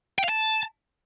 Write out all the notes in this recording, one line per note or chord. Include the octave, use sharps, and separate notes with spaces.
G5
F5
A5